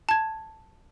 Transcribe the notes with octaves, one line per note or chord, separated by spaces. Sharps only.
A5 G#6